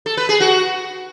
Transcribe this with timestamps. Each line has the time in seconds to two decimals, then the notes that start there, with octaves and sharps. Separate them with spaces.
0.06 A4
0.17 B4
0.29 G#4
0.40 F#4